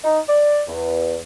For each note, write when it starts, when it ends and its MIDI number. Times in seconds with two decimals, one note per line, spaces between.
0.04 0.19 63
0.29 0.62 74
0.68 1.17 40